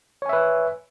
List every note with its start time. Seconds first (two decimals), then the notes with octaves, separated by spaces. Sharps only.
0.22 C#5
0.26 G#5
0.29 E5
0.33 B4